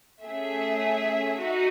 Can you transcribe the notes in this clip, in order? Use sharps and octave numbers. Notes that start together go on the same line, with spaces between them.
A3 C#4 G#4 E5
D#4 F#4